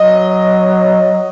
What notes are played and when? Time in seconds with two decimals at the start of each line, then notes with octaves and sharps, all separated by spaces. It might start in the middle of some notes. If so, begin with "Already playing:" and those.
Already playing: F#3 D#5